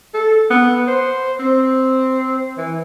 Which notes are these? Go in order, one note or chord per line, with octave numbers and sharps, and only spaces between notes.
A4
B3
C5
C4
E3